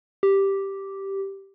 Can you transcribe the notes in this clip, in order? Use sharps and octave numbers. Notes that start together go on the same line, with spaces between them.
G4